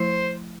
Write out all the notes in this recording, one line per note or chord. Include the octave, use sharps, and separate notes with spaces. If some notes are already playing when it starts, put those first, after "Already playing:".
Already playing: F3 A3 E4 C5